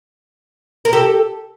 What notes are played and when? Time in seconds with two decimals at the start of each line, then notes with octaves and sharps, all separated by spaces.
0.85 A#4
0.93 G4 A4